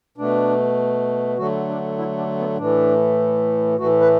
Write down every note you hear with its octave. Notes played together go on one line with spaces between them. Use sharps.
B2 A3 D4
D3 F#3 A3 F#4
D4
E4
D4
B3
A2 E3 A3 D4
A2 E3 A3 F#4
B4